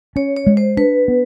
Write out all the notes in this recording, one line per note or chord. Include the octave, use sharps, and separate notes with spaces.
C#4 C#5
C#5
G#3
C5
D4 B4
B3